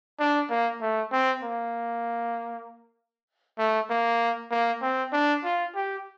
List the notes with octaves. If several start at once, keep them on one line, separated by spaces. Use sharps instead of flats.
D4
A#3
A3
C4
A#3
A3
A#3
A#3
C4
D4
F4
G4